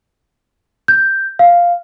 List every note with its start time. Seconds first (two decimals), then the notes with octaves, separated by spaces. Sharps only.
0.88 G6
1.39 F5